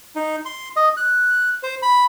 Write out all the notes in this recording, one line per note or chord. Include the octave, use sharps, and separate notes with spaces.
D#4
C6
D#5
F#6
C5
B5